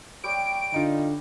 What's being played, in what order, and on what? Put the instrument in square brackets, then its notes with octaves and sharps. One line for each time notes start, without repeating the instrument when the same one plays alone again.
[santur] G3 C#5 G5 [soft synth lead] D7
[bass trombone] D3 [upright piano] D#4 F4